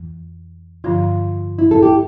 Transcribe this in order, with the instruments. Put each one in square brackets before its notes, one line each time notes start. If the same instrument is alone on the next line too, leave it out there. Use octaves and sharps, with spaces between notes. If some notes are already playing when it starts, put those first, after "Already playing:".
Already playing: [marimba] F2 E3
[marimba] G2 D3 F3 [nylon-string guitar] F4
[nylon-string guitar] E4
A4
G4